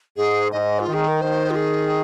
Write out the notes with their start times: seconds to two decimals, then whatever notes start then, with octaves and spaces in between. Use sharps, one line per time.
0.17 G#2 G#4
0.52 G#2 D#5
0.80 F4
0.87 D#3
0.94 G#4
1.07 A#4
1.21 D#3 C5
1.50 F4
1.56 G#4